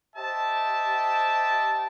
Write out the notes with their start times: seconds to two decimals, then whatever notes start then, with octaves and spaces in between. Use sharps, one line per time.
0.16 G4 C5 D#5 E5 G5 A5